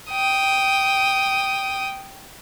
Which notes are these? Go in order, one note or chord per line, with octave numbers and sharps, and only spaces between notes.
G5 D#6